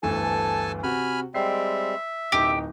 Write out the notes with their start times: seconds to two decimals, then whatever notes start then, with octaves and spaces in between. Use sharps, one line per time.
0.03 G1 D2 E3 A4 G#5 A5
0.83 C3 F#4 G#5 B5 F6
1.34 G3 G#3 C4 E5 C7
2.32 D1 F#2 D#4 G4